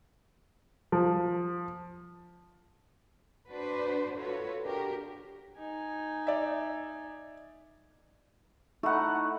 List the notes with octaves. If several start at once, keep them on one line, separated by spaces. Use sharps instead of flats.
F3
D4 F#4 B4 C5 D5
F4 F#4 A4 B4 C#5
D4 F#4 G4 A#4
D#4 G#5
D5 E5
A3 D#4 E4 F#5